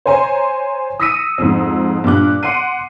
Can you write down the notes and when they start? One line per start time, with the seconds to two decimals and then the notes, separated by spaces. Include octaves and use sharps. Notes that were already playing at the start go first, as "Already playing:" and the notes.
0.06 C5 C#5 G#5 A#5 C6
1.00 D#6 E6 A#6 B6 C#7 D#7
1.38 F2 G#2
2.04 G2 A#2 D6 F#6
2.43 F#5 C6 F#6 C7 D#7